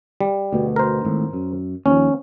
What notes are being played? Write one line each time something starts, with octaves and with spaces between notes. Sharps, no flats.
G3
D2 B2
A#4 C5
G#1 A2
F#2
D#2 F3 C#4